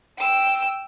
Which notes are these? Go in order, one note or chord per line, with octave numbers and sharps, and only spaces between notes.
G5 E6